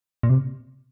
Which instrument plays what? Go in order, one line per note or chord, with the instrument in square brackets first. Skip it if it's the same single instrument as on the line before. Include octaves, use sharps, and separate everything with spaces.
[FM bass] A#2
C3